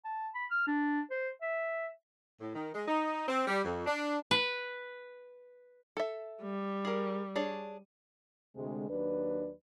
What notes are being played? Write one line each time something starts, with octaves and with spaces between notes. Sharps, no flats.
A5
B5
F6
D4
C5
E5
A2
D#3
G#3
D#4
C4
G3
F2
D4
B4
A4 E5
G3
G#4 A#4
D4 G#4 C#5
D2 C3 G#3
D#2 F#3 D4 B4